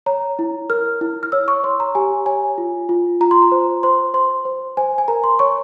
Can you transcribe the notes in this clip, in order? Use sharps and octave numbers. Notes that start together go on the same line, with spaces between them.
C#5 A#5
E4
A#4 F6
E4
F6
C#5 E6
C#6
C#5 C6
A#5
G4 G#5
C#5 G#5
F4
F4
F4 A#5
C6
A#5
C5
C5 C6
C5 C6
C5
C5 G#5
G#5
A#4 A#5
C6
C#5 C#6